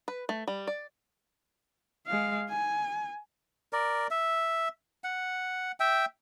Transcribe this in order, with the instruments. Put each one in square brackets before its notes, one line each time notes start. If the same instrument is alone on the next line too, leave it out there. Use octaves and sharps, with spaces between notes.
[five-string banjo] B4
A3
G3
D5
[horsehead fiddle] G#3 F5
G#5
[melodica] A#4 D5
E5
F#5
E5 G5